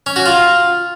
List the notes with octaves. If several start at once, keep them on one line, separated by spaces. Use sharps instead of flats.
C#4
F#4
F4